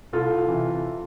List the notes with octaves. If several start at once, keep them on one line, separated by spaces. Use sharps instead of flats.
C2 F4 A4
C3 E3